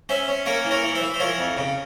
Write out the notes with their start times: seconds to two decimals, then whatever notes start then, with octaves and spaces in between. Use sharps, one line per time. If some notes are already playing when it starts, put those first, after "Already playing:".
0.09 C#4 C5 E5
0.28 C#4
0.46 A#3 A#4 C#5
0.65 E3
0.71 A#4 C#5
0.83 E3
0.95 C5 E5
1.01 E3
1.14 C5
1.20 F3 A#4 C#5
1.38 F2
1.57 C#3